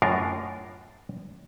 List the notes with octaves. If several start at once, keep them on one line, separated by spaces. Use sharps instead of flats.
F#2 A2 D4 F4 A#4